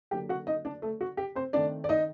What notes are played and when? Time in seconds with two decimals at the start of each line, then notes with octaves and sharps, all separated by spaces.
0.11 D3 F#3 A#3 G4 G5
0.29 F#4 F#5
0.47 D#4 D#5
0.65 D4 D5
0.82 A3 A4
1.01 F#4
1.17 G4
1.35 C4 C5
1.53 D#3 A3 C4 D4 D5
1.84 D5
1.89 D#4 D#5